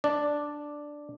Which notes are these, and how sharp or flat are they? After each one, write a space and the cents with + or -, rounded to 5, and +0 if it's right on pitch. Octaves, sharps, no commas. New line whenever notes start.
D4 +0 D5 +0